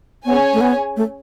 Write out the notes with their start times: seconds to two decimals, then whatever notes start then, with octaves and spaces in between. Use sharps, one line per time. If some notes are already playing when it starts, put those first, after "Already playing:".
0.24 B3 C#4 G#4 C#5 G#5
0.54 A3
0.61 B3
0.97 A3